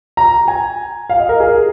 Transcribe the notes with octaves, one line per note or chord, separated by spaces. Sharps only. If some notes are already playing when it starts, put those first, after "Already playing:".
A#5
G#5
F5
D#5
A#4
G#4